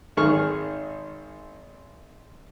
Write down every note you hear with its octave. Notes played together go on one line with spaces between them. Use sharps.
G#1 D#3 G#4 C#6 F6